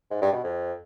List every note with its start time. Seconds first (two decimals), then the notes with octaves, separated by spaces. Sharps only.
0.11 G#2
0.22 G2
0.33 B2
0.44 F2